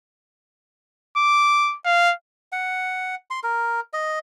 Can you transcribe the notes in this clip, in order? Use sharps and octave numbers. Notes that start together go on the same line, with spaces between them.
D6
F5
F#5
C6
A#4
D#5